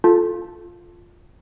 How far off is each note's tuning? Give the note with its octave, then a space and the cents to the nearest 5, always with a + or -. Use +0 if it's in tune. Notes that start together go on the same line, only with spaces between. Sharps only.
F4 +0 A4 -15 A5 +0